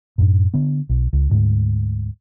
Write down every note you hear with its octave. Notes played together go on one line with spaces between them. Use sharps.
F#2 A2
D3 B3
B1
C#2
D2 G#2